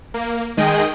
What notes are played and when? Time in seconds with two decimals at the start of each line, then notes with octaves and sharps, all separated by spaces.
0.14 A#3
0.57 D#3 G#3 G#4 D#5 G5